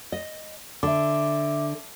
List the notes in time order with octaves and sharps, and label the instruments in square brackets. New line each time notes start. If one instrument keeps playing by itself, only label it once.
[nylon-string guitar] D#5
[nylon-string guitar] D3 [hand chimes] E5 D6